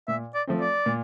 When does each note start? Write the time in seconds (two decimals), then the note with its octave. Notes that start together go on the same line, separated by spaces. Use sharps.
0.08 A#2 E5
0.34 D5
0.47 F3 A3 C4
0.61 D5
0.86 A#2